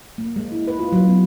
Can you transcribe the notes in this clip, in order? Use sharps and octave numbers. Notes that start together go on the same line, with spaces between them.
A#3
G#3
E4
B4
F4
F#3
B3